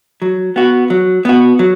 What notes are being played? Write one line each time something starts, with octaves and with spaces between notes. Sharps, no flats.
F#3
B3 F#4
F#3
B3 F#4
F#3